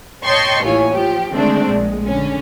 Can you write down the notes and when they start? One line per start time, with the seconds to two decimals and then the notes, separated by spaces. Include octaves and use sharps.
0.24 C#5 D#5 G5 A5 C6 C#6
0.64 A1 D#2 E4 F4 C#5 G#5
0.93 F3 G4
1.32 D3 D#3 G#3 A3 C4 D4
1.67 A#1 A#2 G#3
2.06 D3 C#4